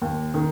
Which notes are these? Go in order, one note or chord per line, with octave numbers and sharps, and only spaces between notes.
D#2
D#3